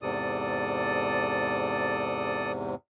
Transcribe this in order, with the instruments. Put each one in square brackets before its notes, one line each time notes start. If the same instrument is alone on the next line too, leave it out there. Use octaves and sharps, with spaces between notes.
[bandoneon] E2 G#2 C3 [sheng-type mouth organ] A4 D5 D#6